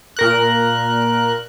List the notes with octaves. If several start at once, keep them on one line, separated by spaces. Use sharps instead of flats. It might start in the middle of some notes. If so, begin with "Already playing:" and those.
A#2 A#4 F#6